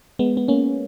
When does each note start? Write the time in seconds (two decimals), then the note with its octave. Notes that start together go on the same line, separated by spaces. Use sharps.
0.19 G#3 B3
0.37 B3
0.48 A#3 C#4